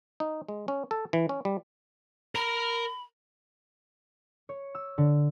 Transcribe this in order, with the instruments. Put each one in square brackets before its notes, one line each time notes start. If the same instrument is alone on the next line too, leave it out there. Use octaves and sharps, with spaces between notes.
[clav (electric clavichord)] D#4
G#3
C#4
A4
E3
C#4
G3
[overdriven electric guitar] A#4 A#5 [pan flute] B5
[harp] C#5
E6
D3